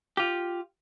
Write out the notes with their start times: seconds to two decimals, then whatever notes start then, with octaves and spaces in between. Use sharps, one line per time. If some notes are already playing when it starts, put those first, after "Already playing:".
0.17 F4 G4